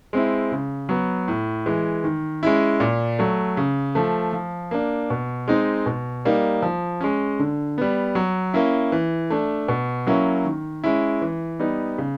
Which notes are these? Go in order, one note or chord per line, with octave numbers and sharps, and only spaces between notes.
G#3 C4 E4
C#3
F#3 B3
A2
E3 G#3
D#3
G#3 C#4 E4
A#2
F#3 A3
C#3
F3 A3
F3
A#3 D4
B2
G#3 C4 D#4
B2
G3 A#3 D#4
F3
G#3 C#4
D3
G3 B3
F#3
A#3 C#4 E4
E3
A3 D4
B2
F#3 A#3 C#4 E4
D#3
G#3 C#4 E4
E3
G3 B3 D#4
C#3